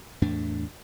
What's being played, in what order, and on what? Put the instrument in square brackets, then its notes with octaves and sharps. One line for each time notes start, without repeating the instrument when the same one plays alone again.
[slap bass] E2 A2 A3 D4